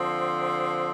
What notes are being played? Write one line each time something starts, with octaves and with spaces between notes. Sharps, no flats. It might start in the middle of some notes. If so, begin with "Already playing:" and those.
Already playing: D3 F3 C4